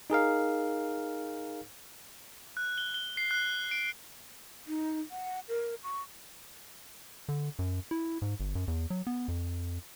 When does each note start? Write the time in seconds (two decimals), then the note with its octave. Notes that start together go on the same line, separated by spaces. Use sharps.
0.10 D#4 G#4 A#4 F5
2.57 F#6
2.78 G7
2.94 G7
3.17 C7
3.31 F#6
3.71 D7
4.67 D#4
5.11 F#5
5.49 A#4
5.83 C#6
7.29 D3
7.59 F#2
7.91 E4
8.22 G#2
8.40 G1
8.55 F#2
8.68 E2
8.90 F#3
9.07 B3
9.28 F2